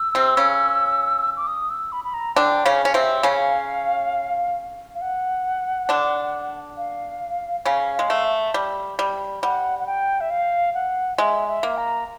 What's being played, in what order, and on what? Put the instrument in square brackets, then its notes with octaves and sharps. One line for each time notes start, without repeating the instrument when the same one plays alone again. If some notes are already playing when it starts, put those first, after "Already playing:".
Already playing: [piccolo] E6
[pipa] C3 C4
C#3 C#4
[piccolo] D6
D#6
E6
B5
B5
A#5
[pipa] D3 D4 [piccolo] G5
[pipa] C#3 C#4 [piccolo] F5
[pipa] C#4
[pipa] C3 C4 [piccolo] E5
[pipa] C#3 C#4 [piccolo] F5
[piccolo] F5
F#5
[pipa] D3 D4
[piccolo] F5
[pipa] C#3 C#4 [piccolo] F5
[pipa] G#3 [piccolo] F5
[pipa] A3
[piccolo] E5
[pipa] G3
G3
[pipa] G3 [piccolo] F#5
[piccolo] F#5
G5
E5
F5
F#5
[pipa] G#3 [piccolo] E5
[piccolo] E5
[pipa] A#3
[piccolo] A#5